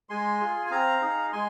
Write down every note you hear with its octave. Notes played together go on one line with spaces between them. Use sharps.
G#3 G#5 C6
F4 G#4
G#5
C4 F5 A#5
D#4 G#4
G#3 G#5 C6